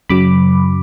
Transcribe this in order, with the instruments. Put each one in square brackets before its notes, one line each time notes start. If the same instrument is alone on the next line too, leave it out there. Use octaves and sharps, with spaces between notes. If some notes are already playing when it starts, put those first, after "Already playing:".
[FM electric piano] F#2 C#3 F#3 B5 D6